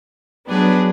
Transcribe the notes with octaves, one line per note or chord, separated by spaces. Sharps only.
F#3 B3 D4 G#4 B4